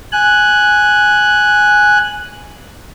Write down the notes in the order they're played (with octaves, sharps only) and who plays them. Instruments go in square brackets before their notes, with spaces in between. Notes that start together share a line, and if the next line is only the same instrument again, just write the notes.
[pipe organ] G#5 F#6